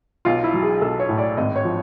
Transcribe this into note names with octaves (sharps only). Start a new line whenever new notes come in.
B1 F4
E4
F#3
G#4
B1 A4
C#5
A2
D5
G#1 D#5
C#5
F3